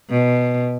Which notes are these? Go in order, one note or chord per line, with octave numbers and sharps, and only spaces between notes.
B2